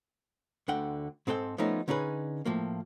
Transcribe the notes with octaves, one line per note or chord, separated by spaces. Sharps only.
D2 D3 F#5 G5
G#2 C4 A4 A#4 G5
F3 A3 B3 C#4 D#4
D3 C#4 D#4 G#4 B4
A2 F3 A#3